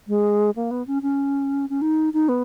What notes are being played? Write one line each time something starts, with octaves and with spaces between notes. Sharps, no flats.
G#3
A#3
B3
C#4
C#4
C#4
D#4
D#4
B3